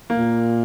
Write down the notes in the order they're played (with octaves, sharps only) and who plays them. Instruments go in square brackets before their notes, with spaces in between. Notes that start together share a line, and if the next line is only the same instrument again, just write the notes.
[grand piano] A#3
[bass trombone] A#2